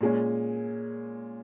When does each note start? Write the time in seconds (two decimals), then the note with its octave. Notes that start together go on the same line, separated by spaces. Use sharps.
0.01 A#2 G#3 C#4